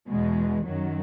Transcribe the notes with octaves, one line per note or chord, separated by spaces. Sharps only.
E2 B2 G#3
F#2 D#3 F#3